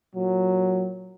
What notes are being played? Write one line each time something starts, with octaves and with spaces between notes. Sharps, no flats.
A#2 F#3